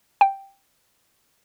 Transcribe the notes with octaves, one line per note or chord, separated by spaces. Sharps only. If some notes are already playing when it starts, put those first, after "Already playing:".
G5